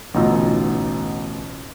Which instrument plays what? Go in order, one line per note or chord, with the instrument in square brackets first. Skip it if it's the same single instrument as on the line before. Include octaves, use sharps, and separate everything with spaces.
[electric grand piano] A1 D2 B2 D#4 F4 E6